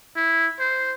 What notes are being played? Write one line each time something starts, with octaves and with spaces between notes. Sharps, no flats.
E4
C5